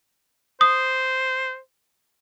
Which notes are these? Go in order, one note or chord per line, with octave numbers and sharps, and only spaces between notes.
C5 D#6